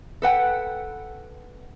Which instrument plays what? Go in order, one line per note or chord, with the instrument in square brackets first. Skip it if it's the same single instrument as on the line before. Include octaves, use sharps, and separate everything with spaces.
[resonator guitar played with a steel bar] A4 B4 F#5 G5